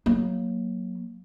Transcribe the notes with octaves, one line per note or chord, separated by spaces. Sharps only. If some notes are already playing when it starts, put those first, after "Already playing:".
F#3 A#3